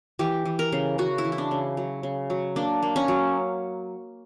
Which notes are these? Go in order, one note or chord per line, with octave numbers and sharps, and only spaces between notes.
E3 G4
E3
A#4
C#3
C#3 F#4
E4
E3
E4
D4
C#3
F#3
C#3
F#3
A#3 D4
A#3
C#4
F#3